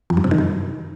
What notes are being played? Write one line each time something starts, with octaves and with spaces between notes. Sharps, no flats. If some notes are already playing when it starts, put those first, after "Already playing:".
F2
G2
C3
D#3
F#2